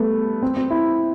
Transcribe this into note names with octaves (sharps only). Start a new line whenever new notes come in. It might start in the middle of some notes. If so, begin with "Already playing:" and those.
Already playing: G3 A3 B3
C4
C4
E4